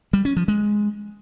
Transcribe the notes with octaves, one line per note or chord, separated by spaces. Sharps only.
G3
C#4
F3
G#3